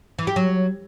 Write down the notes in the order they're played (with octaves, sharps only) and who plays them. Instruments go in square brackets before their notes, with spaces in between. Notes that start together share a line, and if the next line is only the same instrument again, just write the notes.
[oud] E3
G4
F#3